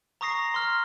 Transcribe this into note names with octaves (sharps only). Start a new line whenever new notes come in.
A#5 C#6 D#6 A#6 C7
C6 F6